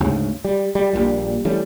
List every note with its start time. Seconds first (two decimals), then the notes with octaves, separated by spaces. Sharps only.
0.01 D2 G#2 C#3
0.45 G3
0.75 G3
0.93 A#1 D#2 A#2 G3
1.45 E3 G3 A3 C#4